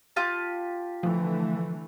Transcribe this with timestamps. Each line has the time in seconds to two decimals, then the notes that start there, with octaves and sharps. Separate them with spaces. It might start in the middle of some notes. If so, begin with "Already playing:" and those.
0.16 F4 G4 A5
1.03 D3 E3 F3 A3